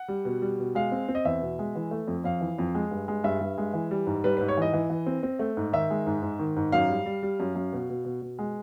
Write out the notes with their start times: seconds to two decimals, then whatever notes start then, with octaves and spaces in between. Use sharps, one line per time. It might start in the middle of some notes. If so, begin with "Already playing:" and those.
Already playing: F#5
0.08 G3
0.25 B2
0.42 G3
0.59 B2
0.75 G#3 F5
0.92 C4
1.08 C4
1.15 D#5
1.25 E2 E5
1.42 B2
1.59 G#3
1.75 E3
1.91 A3
2.08 F2
2.24 F2 F5
2.41 E3
2.58 F2
2.75 G#3
2.91 G2
3.08 G#3
3.24 G2 E5
3.40 G2
3.58 G#3
3.73 E3
3.91 G3
4.07 G#2
4.24 G3 B4
4.37 G#2 B4
4.48 C#5
4.57 E3 D#5
4.73 E3
4.90 E3
5.06 C4
5.23 C4
5.39 A3
5.57 G#2
5.73 D#3 E5
5.90 G#3
6.06 G#2
6.22 G#2
6.39 D#3
6.56 G#2
6.72 F#2 F5
6.89 G3
7.06 G3
7.23 G3
7.40 F#2
7.55 F#2
7.73 B2
7.89 B2
8.05 B2
8.22 B2
8.39 G#3